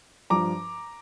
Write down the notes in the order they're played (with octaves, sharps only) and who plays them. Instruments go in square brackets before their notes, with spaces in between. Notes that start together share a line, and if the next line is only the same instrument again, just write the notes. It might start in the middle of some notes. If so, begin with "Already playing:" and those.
[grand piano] G2 F3 A#5 D6